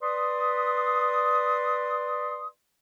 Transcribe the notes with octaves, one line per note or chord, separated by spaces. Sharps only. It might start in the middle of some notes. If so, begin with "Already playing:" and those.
B4 D5 C6 D#6